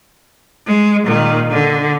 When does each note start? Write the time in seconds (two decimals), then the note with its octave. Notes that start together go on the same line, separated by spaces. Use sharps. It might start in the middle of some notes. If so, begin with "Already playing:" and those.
0.66 G#3
1.05 A#2 D#3
1.50 D3